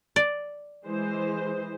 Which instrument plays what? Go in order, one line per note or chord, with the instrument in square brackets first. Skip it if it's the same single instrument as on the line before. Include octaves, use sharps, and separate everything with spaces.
[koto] D5
[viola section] E3 G#3 C5